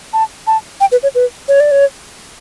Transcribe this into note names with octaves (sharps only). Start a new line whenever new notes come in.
A5
A5
G5
B4
C#5
B4
C#5
D5
C#5